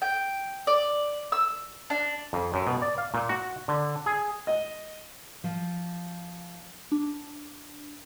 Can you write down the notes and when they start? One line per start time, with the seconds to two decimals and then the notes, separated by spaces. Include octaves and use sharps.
0.02 G5
0.67 D5
1.32 E6
1.90 D4
2.33 F2
2.54 F#2
2.67 B2
2.82 D5
2.98 F5
3.14 A#2
3.29 F#4
3.68 D3
4.06 G#4
4.47 D#5
5.44 F3
6.92 D4